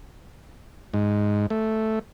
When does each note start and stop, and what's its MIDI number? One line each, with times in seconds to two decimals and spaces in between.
0.94 1.46 44
1.50 1.99 57